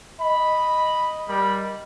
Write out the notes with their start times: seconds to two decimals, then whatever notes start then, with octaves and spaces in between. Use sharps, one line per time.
0.21 D#5 B5
1.28 G3 A#4 B5